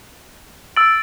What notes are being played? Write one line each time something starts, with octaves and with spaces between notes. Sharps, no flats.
E6 A6 D7 F#7